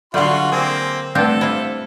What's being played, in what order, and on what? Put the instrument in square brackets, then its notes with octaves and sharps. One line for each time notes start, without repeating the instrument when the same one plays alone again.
[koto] D3 G3 [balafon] F#3 A4 F#5 [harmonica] F4 F#4 C6
[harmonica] A#3 C4 [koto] G#4
[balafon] G3 A3 B4 [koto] C4 D4 G4 [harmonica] A4
[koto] E4 F4 [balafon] C5